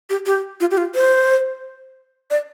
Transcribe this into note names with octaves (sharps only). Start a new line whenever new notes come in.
G4
G4
F4
G4
F4
C5
D5